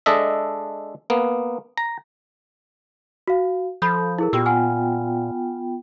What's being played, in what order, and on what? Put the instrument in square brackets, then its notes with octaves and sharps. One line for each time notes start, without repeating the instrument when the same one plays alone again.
[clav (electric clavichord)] G#3 D4 A4 D#5 E5
A#3 B3
A#5
[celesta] F#4 F5
[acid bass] F3 [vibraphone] A4 [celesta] B5 D#6 G6
[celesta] E4 G#4 A#4
[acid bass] A#2 [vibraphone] B3 F4 G5 [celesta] G4 E6
[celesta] F#5 G#5 F6